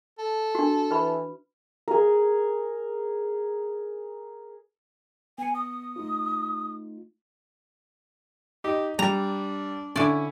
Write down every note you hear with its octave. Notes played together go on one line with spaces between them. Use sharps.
A4
D4 F#4
E3 B4 B5
G#4 A#4
B3 G#5 C#7
D#6
A3 D#4 F4
D#4 G4
G3 D4 A#5
D3 C#4 E4 D5